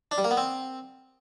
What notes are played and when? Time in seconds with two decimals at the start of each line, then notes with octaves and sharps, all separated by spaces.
0.11 D4
0.18 G3
0.24 A#3
0.31 B3
0.37 C4